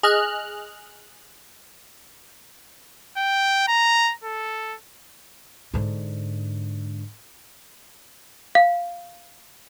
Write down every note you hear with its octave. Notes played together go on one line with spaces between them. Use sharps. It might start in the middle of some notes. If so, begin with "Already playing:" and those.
G#4 D#5 F6 F#6
G5
A#5
A4
G#2 D3
F5